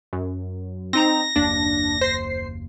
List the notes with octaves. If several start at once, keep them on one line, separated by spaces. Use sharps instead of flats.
F#2
C4 D#4 A#5 A#6
F#1 D#2 A#3 D4
C5 C7